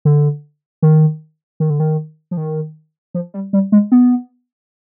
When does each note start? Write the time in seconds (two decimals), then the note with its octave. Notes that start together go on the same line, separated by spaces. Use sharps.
0.05 D3
0.82 D#3
1.60 D#3
1.70 D3
1.80 D#3
2.31 F3
2.37 D#3
3.14 F3
3.34 G3
3.53 G3
3.72 G#3
3.92 B3